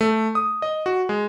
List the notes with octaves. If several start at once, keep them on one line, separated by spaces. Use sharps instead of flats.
A3
D#6
D#5
F#4
G#3